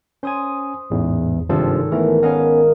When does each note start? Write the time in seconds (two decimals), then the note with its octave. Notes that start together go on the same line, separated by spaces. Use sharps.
0.23 C#4 C5 G#5 D#6
0.90 A1 E2 G#2
1.49 G#1 G2 C3 F3 A4
1.92 E3 A3 B3 A#4
2.23 B3 C#4 A#4 D#5 F5